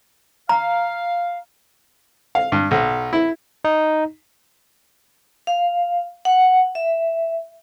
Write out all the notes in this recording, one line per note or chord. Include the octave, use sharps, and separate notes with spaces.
F5 A#5
F5
G2
B1
E4
D#4
F5
F#5
E5